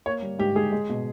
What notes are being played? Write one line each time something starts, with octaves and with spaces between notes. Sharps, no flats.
A#3 C#5
G3
G#2 G4
G#2 G#4
G#3
B2